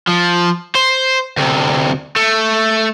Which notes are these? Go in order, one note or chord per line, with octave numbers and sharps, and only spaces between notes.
F3
C5
D2 C3
A3